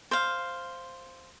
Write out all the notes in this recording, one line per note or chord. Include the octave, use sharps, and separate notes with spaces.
C5 F5